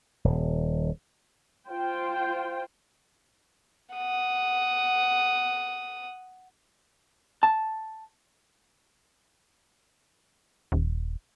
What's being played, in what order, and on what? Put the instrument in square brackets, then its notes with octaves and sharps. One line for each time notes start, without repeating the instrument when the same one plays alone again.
[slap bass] D#1
[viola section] F4 C5 G5
[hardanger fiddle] F#5 D#6
[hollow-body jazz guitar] A5
[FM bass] D#1